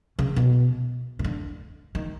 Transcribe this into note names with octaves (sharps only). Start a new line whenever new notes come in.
C#3
B2
C#3
D3
D#3